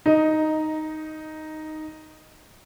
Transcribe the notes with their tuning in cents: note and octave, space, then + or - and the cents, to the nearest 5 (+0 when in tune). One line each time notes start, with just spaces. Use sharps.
D#4 +0 D#5 +15